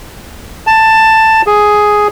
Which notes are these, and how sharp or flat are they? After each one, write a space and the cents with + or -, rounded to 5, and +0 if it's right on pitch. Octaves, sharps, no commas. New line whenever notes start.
A5 +10
G#4 +5